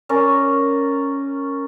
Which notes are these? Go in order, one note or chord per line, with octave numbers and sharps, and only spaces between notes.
C#4 A#4 D5